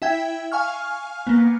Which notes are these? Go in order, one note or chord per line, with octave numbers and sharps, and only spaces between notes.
E4 E5 G5 G#6
F5 G#5 C#6 F6
A#3 B3